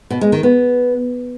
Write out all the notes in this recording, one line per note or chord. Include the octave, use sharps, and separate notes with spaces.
B2
G#3
D#3
B3